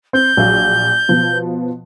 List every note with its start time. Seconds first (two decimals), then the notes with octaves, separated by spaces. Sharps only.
0.13 C4 G6
0.37 A#1 F#3 F5
1.08 B2 F3 B3